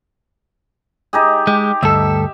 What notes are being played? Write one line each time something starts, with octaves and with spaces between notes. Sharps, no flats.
D#4 G4 G#4
G#3 G4
D2 G2 A4 E5